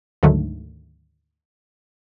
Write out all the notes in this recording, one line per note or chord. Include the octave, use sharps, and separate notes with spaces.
D2 G#2 D3 D#3 F#3 A3